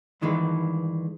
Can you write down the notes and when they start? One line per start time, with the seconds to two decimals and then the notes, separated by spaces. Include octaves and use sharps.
0.22 G2 D#3 E3 G#3